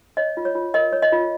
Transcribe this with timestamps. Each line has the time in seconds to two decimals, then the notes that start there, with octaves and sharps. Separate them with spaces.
0.17 C#5 D#5
0.37 F4
0.45 C#5
0.55 F4
0.74 A#4 D#5
0.93 C#5
1.02 D#5
1.12 F4